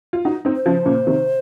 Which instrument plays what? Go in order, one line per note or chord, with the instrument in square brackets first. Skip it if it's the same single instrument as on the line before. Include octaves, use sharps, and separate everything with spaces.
[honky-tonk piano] F4
D#4 F#4
C4 D#4
[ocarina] C5
[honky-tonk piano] C#3 F3
A#2 C#3
C3 D#3